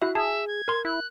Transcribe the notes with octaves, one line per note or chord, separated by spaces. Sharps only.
E4 F#4 E5 F#6
G#4 E5 A5
G#6
A#4 C6
E4 F#6